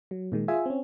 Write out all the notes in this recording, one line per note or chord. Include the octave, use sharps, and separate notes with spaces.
F#3
A#2 D#3 G#3
F4 G#4 E5 G#5
C4 C#4